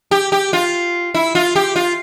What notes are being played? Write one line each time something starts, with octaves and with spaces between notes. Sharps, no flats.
G4
G4
F4
E4
F4
G4
F4